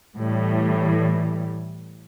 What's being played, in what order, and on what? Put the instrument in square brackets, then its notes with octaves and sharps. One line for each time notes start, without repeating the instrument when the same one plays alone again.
[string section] A2 E3 G3